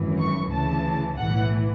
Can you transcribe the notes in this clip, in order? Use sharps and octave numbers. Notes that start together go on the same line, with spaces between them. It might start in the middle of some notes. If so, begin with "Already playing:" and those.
Already playing: G#1 F#2 E3
C#6
D2 C#3 E3 A5
B1 A2 E3 F#5